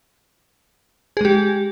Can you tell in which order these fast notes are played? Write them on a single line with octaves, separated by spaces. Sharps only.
G#4 G#3 G4